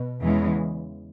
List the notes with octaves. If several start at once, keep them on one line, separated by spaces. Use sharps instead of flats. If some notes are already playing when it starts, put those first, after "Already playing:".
Already playing: B2
E2 C#3 E3 G#3